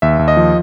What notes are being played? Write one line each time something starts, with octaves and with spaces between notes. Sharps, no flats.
D#2 E5
D#2
D#5
F3